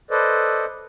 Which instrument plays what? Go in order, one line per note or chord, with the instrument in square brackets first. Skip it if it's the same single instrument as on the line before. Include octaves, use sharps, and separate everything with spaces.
[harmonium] A4 B4 C5 D5 D#5